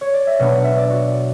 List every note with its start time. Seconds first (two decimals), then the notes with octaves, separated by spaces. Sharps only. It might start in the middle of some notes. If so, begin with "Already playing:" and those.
0.01 C#5
0.14 D5
0.27 E5
0.39 B2 F#3 B3 D4 F#5
0.52 F#5
0.64 E5
0.78 D5
0.90 F#4